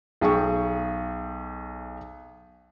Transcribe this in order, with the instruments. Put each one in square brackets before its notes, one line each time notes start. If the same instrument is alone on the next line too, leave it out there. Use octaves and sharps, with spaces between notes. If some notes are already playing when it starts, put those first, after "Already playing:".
[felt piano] B1 G#4 G5 C#6